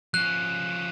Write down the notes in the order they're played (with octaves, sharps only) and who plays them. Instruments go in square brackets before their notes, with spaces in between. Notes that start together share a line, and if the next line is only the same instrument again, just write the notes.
[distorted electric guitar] F3 C#4 [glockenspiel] F#6